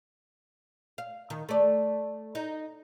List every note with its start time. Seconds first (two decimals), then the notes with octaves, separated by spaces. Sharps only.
0.98 F5
1.30 D#3
1.49 A3 D5
2.35 D#4